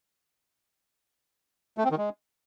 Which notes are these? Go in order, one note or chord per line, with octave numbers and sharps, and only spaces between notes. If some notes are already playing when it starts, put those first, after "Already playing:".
A3
C4
D#3
G#3